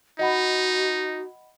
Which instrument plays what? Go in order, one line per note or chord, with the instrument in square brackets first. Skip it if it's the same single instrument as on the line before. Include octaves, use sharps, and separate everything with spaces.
[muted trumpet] D#4 [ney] F#4 [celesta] D#5 F#5 B5